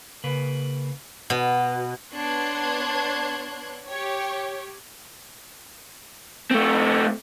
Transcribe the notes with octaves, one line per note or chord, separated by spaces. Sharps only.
C#3 A#3 B4
B2
B3 D4 C#5 C6 F#6 G#6
G4 C#5
A3 C4